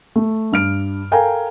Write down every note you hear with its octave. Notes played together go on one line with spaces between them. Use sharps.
A3
G2 F6 D7
A4 A#4 F5 G5 G#5 A#5